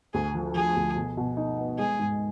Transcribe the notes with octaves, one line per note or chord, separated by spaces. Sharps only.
D2 G#4
F3
F3 G#4
D2
B2
B2
D#4
B3
G#3 G#4
G#2